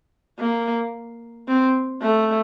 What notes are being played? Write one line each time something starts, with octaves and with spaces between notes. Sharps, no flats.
A#3
C4
A3